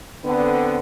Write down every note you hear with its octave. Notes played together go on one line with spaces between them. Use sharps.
D3 B3 C4